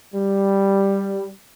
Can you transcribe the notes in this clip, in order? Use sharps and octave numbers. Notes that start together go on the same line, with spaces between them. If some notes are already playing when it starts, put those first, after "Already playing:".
G3